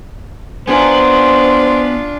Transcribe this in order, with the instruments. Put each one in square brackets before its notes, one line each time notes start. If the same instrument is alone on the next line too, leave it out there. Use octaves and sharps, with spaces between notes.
[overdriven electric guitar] B3 [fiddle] D4 F4 [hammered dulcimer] G#4 G#5 A#5 [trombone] C5